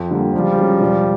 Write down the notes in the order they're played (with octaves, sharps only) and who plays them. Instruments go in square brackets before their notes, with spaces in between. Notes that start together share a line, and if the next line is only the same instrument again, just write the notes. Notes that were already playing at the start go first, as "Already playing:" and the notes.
Already playing: [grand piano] F2
D3 G3 A#3
[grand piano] C#2 [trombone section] F3 G3
[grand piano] C#3 F#3
E1